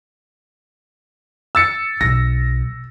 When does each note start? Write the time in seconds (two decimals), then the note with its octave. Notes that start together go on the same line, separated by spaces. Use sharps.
1.55 E6 A6 C#7
2.01 B1 A#6